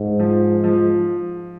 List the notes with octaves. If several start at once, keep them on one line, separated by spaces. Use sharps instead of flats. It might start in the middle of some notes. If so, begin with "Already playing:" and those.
Already playing: G#2
F3
F3